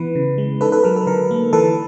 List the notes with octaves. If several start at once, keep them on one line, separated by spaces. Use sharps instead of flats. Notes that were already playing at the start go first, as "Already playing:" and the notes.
Already playing: E3 B3 B4
C#3
G#3
D#4 A4 B4
A4 B4
F#3 A#4
A4
D3 A#4
A#3
E3 A4 B4